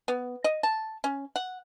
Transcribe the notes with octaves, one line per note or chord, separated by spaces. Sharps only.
B3
D#5
A5
C#4
F#5